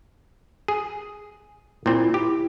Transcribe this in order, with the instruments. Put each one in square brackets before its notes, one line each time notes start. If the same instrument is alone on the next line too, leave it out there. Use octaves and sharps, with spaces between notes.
[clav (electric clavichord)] G#4
[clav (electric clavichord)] A#2 C4 [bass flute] E4
[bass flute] E4 [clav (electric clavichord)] G4